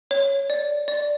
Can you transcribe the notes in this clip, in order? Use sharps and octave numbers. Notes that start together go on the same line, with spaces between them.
C#5
D5
D5